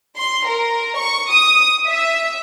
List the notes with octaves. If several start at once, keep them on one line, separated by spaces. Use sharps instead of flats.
C6
A#4
C#6
D#6
E5